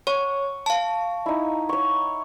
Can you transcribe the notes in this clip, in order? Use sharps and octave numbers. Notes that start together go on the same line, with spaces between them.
C#5 C#6
F5 A5
D#4 E4
C#5 C#6